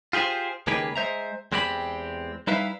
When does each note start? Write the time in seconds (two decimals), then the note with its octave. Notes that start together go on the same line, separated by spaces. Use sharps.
0.13 F4 G4 G#4 B4 C5
0.67 C#2 D#3 A#3 G4 G#4 B4
0.96 G#3 C5 E5 A#5
1.52 E2 G#3 C4 G4 A#4 B5
2.47 G3 D#4 E4 B4 E5 F5